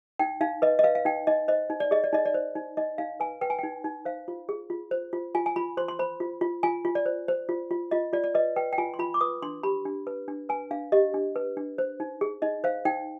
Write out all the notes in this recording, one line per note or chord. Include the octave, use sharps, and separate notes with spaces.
D#4 G5
D#4 F5
B4 D#5
D#5
B4 F5
F5
D#4 G5
D#4 D#5
C5 D#5
D#4
D5
G#4 D#5
D5
D#4 D#5
D5
C5
D#4
D#4 D#5
D#4 F5
B4 G#5
B4 G5
G#5
D#4 G5
D#4
C5 F5
F4
G#4
F4
C5
F4
F4 G#5
G#5
F4 B5
C5 C6
C6
C5 B5
F4
F4
F4 G#5
F4
D5
C5
C5
F4
F4
F4 D#5
F4 D5
D5
B4 D#5
B4 G5
G5
F4 G#5
C6
F4 B5
D6
B4 D#6
D4 C6
G4 B5
D4
B4
D4
B4 G#5
D4 F5
G4 D#5
D4
B4
D4
C5
D#4
G#4
D#4 D#5
C5 F5
D#4 G5